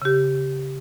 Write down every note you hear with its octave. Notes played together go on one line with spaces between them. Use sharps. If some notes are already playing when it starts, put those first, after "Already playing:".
C#3 G4